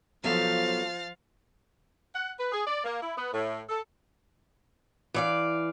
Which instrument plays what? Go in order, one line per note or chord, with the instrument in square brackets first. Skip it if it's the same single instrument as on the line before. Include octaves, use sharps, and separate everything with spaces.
[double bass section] F3 [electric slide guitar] F#3 B3 A4 [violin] F5 A6
[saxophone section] F#5
B4
G#4
D5
A#3
E4
B3
A2
A4
[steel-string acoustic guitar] E3 D5 F5